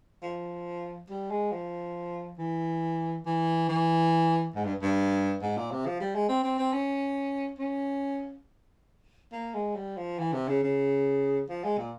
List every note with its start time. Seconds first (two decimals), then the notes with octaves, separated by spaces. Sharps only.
0.22 F3
1.09 G3
1.31 G#3
1.52 F3
2.38 E3
3.26 E3
3.69 E3
4.55 G#2
4.64 G2
4.82 G2
5.42 G#2
5.57 A#2
5.71 C3
5.86 F3
6.01 G3
6.15 G#3
6.28 C4
6.44 C4
6.58 C4
6.73 C#4
7.59 C#4
9.32 A#3
9.54 G#3
9.75 G3
9.97 F3
10.19 E3
10.33 C3
10.48 C#3
10.63 C#3
11.49 F3
11.64 G#3
11.78 A#2